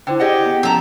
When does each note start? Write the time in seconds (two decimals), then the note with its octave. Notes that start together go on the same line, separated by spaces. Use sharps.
0.07 D3 E4 C5 G5
0.20 G4 G#4 D5 D#5 F#5
0.46 B3
0.63 F3 C#4 A4 A5 A#5